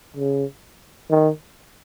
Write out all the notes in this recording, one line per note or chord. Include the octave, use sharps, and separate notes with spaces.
C#3
D#3